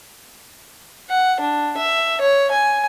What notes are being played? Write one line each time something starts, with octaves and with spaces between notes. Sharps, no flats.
F#5
D4
E5
C#5
G#5